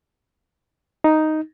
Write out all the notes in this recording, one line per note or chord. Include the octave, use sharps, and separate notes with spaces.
D#4